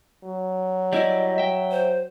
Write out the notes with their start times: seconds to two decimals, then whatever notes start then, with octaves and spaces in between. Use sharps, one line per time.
0.24 F#3
0.93 G3 E4 D5 D#5
1.38 E5 G5
1.71 C5